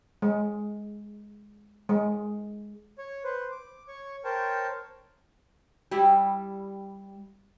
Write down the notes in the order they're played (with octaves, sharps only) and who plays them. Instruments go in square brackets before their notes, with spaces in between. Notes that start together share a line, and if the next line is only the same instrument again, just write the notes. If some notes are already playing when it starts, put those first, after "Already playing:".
[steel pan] G#3
G#3
[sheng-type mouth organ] C#5
B4 C5
D6
C#5 C#6
A#4 C5 C#5 G5 A5
[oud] G3 E4